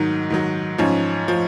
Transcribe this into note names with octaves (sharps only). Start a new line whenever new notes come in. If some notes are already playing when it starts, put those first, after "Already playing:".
Already playing: G#2 D#3 F#3
G#2 D#3 F#3
G#2 F3 C#4
F3